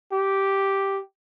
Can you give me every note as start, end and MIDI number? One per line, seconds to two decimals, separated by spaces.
0.13 1.00 67